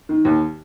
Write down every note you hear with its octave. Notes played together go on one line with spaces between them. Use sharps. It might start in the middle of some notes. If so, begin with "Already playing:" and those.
D#3
D#2